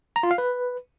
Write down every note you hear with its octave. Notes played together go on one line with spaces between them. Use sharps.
A#5
F4
F5
B4